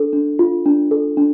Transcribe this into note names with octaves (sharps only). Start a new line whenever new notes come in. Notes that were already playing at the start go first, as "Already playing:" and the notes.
Already playing: D4 A4
D4
F4
D4
A4
D4